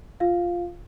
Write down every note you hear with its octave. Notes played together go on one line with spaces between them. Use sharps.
F4 F5